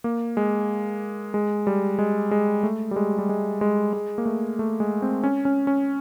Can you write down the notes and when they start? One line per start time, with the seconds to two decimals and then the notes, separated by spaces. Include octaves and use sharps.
0.04 A#3
0.37 G#3
1.34 G#3
1.67 G3
1.99 G#3
2.31 G#3
2.63 A3
2.91 G3
2.96 G#3
3.18 G3
3.29 G#3
3.61 G#3
3.93 G#3
4.18 A#3
4.26 A3
4.59 A3
4.80 G#3
5.02 C4
5.24 C#4
5.45 C#4
5.67 C#4